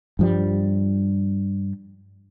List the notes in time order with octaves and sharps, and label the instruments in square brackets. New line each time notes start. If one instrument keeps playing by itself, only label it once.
[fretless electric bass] G2 F3 G3